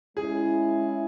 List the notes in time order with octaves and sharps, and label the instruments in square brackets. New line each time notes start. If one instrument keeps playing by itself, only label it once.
[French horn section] G#3 C#4 E4 [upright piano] G#4